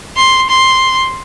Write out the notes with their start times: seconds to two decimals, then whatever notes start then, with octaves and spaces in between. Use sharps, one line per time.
0.16 C6
0.50 C6